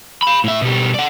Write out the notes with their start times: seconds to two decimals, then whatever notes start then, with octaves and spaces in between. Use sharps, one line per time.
0.23 F5 B5
0.44 A2 E5
0.61 B2 G3
0.94 D5 F#5